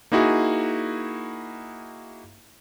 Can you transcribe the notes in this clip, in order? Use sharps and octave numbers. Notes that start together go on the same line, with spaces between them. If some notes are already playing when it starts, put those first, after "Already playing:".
A#3 D#4 E4 F#4 G#4